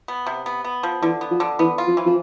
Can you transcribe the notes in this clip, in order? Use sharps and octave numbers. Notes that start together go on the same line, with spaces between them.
B3
C3
B3
B3
F3
D3 E3
B3
F3
D3
E3 B3
F4
F3
E3
F3